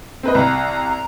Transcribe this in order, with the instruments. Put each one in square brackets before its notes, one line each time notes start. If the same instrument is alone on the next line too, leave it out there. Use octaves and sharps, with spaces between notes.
[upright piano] C4 B4 D#5
[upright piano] C2 [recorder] A#5
[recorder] A#5